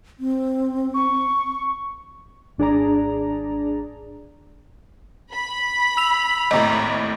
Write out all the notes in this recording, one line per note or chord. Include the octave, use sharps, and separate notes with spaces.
C4
C#6
G#1 D4 G#4 D5 A#5
B5
E6 F7
G#1 D#2 A2 D#5 A#5